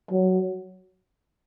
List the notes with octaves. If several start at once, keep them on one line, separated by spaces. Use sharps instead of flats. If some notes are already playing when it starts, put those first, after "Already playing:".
F#3